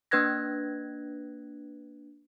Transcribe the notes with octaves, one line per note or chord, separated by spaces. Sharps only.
A#3 D4 B4 F#6 G#6 A#6